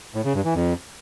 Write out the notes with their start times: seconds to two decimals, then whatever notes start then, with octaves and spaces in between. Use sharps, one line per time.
0.15 A2
0.25 C#3
0.35 G2
0.45 E3
0.55 F2